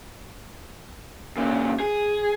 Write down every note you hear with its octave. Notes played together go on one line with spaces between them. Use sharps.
A#2 C#3
G#4